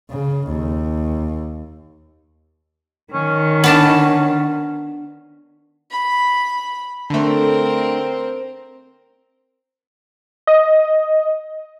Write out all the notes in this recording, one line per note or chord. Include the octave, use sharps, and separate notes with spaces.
C#3
D#2
D#3 C#4
B3 D4 A5
B5
D3 A3 C4 A#4
D#5